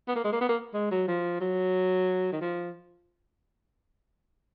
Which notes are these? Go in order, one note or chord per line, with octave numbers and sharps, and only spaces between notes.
B3
A#3
G#3
A#3
B3
A#3
G#3
F#3
F3
F#3
D#3
F3